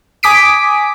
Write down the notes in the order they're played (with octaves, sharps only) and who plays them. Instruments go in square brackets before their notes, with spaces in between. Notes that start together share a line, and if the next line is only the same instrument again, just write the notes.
[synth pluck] G#5 D6 D#6 B6 D7